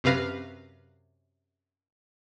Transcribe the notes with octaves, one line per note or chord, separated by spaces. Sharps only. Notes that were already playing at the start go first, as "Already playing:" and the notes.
F#2 C3 B4 F5 A#6 C7